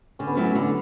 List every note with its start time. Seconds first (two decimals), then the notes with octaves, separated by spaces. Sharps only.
0.19 D3 C#4
0.27 B3
0.35 F#3 A3 C#4 E4
0.55 D3